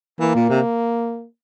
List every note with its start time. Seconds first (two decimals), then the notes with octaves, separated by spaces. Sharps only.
0.20 E3 A#3
0.35 A#2
0.50 C3